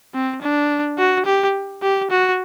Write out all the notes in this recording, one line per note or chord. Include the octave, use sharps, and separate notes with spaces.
C4
D4
F#4
G4
G4
F#4